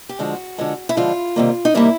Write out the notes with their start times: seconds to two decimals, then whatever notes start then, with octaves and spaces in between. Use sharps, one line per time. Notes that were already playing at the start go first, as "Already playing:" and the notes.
0.09 G4
0.19 D3 F3 G#3 F#4
0.58 D3 F3 G#3
0.89 E4
0.97 D3 F3 G#3 F4
1.36 C3 D#3 G3 A#3
1.65 D#4
1.74 C3 D#3 G3 A#3 E4